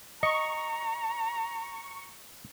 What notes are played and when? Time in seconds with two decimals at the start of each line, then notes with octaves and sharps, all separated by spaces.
0.23 D#5 A#5 C#6